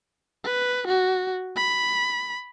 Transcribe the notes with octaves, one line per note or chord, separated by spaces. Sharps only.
B4
F#4
B5